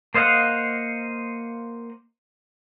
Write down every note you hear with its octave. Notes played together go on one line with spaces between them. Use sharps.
A#3 C5 D#5 F5 F#5